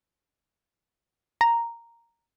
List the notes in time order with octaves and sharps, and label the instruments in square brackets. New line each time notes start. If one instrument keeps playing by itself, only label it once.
[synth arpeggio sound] A#5